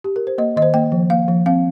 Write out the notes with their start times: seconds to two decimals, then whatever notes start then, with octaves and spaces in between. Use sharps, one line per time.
0.04 G4
0.16 A#4
0.27 C5
0.38 A#3 D#5
0.56 D#3 D#5
0.62 C5
0.74 A#3 G5
0.92 F3
1.10 A#3 F5
1.28 F3
1.46 C4 F5